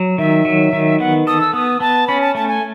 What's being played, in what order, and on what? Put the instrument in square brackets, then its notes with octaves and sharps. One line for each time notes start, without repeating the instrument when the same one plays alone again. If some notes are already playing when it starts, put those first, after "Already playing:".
Already playing: [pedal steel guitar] F#3
[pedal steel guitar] D#3 [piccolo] E5
[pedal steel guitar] F#3
D#3
[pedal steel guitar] B3 [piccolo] F#5
[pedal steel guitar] A4 [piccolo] D#6
[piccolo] E6
[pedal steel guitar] B3 [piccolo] D#6
[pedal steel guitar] B3 [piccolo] A5
[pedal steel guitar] C#4 [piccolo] B5
[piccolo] A5
[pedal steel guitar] A3 [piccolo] A5
[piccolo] G#5